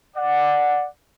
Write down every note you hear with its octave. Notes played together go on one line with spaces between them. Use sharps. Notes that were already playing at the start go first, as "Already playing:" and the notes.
D5 F#5